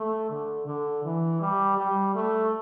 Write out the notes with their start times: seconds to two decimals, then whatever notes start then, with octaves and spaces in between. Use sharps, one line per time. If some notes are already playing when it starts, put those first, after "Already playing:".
Already playing: A3
0.30 D3
0.67 D3
1.04 E3
1.41 G3
1.78 G3
2.15 A3